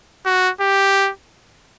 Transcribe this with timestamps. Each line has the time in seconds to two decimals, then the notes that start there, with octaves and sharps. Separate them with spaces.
0.25 F#4
0.60 G4